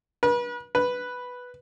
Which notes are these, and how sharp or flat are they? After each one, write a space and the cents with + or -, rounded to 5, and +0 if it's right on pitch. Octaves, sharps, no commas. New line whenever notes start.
B4 -35
B4 +0